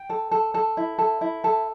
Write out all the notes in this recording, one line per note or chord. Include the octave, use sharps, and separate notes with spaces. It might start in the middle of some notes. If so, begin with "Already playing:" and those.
Already playing: G5
A4
A4
A4
E4
A4
E4
A4